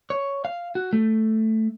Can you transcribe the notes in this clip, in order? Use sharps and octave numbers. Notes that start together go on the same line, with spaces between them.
C#5
F5
F#4
A3